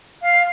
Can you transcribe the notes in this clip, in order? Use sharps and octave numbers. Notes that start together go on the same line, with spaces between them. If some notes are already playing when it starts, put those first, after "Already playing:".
F5